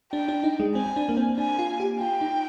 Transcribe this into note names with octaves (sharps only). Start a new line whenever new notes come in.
D4 G5
D4
D#4
G#3
C4 G#5
C4
D4
A#3
C4
C4
D4 G#5
F4
G4
F4 G5
D#4